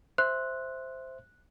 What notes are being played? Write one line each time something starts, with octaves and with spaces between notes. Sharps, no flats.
C5 E5 F#6